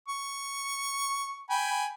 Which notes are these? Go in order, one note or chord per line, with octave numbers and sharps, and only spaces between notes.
C#6
G5 G#5 B5